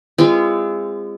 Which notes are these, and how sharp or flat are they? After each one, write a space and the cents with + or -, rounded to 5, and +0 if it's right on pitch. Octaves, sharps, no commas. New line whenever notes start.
G#3 -30 C4 +0 F4 -30